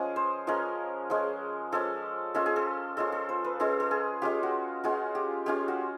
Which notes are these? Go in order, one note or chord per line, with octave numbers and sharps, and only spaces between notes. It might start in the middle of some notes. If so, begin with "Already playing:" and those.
Already playing: F3 G#3 C#4 G#4
C5
F3 G#3 C#4 A#4
F3 G#3 C#4
F3 G#3 C#4 A4
G#3 C#4 F4 A4
G#4
A4
G#3 C#4 F4 A4
A4
C5
B4
G#3 C#4 F4 A4
A4
G#4
G#3 C#4 F4 G4
F#4
G#3 C#4 F4 F#4
G4
G#3 C#4 F4 G4
F#4